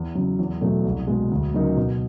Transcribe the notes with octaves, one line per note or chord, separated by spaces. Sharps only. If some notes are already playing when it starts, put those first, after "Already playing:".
Already playing: E2
C#3 F#3
E2
B2 F#3 A3
C2
B2 G#3
D2
C#3 F#3 A#3 D#4
B2